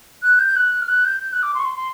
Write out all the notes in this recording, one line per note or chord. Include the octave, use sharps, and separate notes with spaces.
F#6
G6
F#6
F6
F#6
G6
G6
F#6
D6
C6
C#6
C6
C6